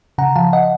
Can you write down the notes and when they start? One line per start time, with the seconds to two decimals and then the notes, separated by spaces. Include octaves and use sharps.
0.18 C#3 F#5 A#5
0.36 F3 F5 A5
0.53 D#5 F#5